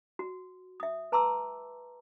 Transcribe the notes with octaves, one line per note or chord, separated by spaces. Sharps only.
F#4
E5 D#6
B4 A5 A#5 C6 D6 E6